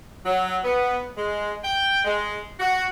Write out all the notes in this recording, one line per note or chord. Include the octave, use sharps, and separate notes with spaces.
F#3
B3
G#3
G5
G#3
F#4